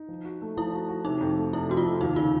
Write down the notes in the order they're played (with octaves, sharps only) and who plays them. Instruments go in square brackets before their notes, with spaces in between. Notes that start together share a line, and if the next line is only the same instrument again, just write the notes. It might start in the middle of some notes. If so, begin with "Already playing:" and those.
Already playing: [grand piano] D#4
F3
F#4
A3
[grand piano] F3 [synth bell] E4
[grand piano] F#4
F#4
[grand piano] C3 [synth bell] D#4
[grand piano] F2
A3
[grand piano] C3 [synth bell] E4
[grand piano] F2 [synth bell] F#4
[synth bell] F4
[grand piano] C3
[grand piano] D#2 [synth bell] D#4
[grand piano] C#3 [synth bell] F4